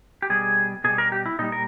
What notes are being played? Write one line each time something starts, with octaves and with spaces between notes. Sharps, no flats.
G4
B2 G3 G#4
B2 G3 G#4
A#4
G4
E4
A#2 G3 D#4
A#4